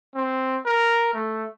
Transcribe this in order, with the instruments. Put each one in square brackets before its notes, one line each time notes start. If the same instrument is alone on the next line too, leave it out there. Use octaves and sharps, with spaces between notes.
[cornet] C4
A#4
A3